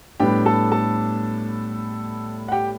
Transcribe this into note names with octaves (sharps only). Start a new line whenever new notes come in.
A2 G3 B3 D4 G4 G5
A4 A5
A4 A5
F#5
G4 G5